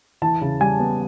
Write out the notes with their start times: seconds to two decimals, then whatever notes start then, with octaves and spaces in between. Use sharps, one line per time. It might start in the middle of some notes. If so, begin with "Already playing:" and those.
0.22 E3 A5
0.41 C#3
0.60 G3 G#5
0.80 B3